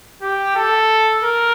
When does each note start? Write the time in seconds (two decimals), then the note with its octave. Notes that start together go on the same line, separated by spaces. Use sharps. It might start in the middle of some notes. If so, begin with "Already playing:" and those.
0.22 G4
0.55 A4
1.23 A#4